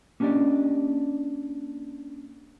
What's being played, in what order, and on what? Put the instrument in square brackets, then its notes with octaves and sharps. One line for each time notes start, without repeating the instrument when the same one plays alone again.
[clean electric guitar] A#3 C#4 D4 G4 D5 D#5